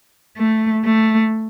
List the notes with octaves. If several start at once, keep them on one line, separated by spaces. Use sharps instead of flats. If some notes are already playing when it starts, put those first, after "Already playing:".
A3
A3